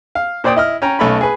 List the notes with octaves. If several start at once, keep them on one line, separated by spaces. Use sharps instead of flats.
F5
A#2 C5 D5 G5 D#6
E4 D#5 F6
C#4 G5 A#5
B1 A3 C#4 B5
G#4 B4